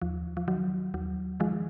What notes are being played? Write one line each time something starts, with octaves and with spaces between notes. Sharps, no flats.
D#2 F3
F3
D#3 F#3
D#2 F#3
D#3 F3 G#3